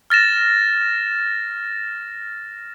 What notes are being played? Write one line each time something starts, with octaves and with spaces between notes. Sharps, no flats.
F6 A6 A#6 E7